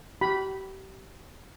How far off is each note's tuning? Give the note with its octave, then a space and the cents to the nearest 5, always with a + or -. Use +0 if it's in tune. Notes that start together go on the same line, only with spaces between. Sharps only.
G4 -35 B5 -5